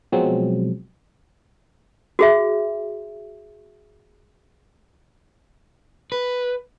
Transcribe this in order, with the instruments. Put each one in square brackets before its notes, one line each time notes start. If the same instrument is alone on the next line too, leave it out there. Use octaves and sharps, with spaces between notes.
[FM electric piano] B2 F3 F#3 G#3 C4
[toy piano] F#4 G#4 E5
[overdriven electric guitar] B4